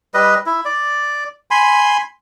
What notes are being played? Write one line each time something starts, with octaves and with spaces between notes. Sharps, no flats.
G3 B4 D#5
E4
D5
G#5 B5 C6